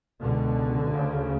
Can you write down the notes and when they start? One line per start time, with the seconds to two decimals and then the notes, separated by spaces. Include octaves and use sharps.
0.22 C#2 B2 D3
0.95 D2 C#3